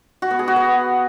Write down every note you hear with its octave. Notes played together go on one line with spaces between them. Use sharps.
F#4
B3
G#4
F#4
B4